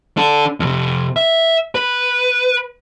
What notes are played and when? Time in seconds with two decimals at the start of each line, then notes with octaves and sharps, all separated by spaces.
0.17 D4 A4
0.60 F2 C3
1.16 E5
1.75 B4